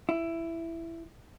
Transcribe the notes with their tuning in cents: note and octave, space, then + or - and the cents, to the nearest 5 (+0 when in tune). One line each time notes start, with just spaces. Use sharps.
E4 +10